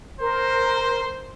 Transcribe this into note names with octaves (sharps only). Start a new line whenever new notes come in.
A#4 C5